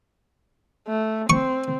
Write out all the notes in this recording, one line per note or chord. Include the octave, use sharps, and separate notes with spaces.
A3
C4 C#6